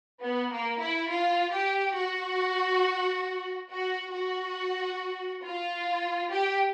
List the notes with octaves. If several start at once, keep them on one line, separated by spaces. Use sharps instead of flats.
B3
A#3
E4
F4
G4
F#4
F#4
F#4
F4
G4